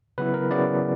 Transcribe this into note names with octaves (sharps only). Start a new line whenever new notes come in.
C#3 F#3 B3 E4 B4
A#4
C#3 F#3 B3 E4 D5